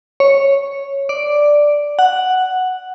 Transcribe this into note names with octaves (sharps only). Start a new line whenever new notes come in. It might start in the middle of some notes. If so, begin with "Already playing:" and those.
C#5
D5
F#5